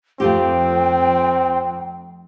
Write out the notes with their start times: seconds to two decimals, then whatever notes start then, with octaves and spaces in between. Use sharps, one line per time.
0.20 F2 A3 C4 F4 G4 G5